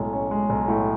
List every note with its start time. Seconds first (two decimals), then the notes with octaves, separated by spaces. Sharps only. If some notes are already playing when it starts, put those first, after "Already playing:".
Already playing: B1 A2 G#3 C#4
0.13 C#4
0.31 G#3
0.50 B1
0.68 A2